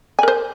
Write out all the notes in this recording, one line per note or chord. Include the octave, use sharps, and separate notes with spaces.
A#4 C5 G#5